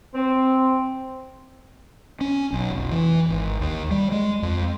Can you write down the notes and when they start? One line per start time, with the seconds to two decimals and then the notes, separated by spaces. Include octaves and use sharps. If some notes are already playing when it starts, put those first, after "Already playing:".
0.15 C4
2.21 C#4
2.53 B1
2.71 F1
2.92 E3
3.29 G#1
3.60 D#2
3.91 G3
4.12 G#3
4.42 F2